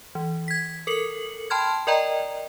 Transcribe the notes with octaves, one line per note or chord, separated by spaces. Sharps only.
E3
G#6 B6
A4 A#4 C#7 F#7
G5 A5 B5 C6 F6 G#6
A#4 D5 D#5 G5 A#5